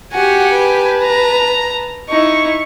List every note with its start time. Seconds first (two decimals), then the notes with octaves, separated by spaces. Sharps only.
0.13 F#4 G4 F#5 G#5
0.52 B4 A5
1.03 A#5
2.10 D#4 E4 C#6